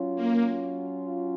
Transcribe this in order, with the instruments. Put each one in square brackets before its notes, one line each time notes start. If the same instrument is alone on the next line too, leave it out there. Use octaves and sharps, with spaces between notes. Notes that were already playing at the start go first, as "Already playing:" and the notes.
Already playing: [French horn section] F#3 C#4 F4
[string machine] A#3